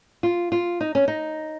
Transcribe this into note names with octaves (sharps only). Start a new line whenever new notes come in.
F4
F4
D#4
C#4
D#4